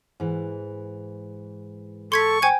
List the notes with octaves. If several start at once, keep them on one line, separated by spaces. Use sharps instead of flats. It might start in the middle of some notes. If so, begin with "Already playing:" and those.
G#2 E3
A4 C6 C#6 G#6 B6
C5 G5 G#5 G#6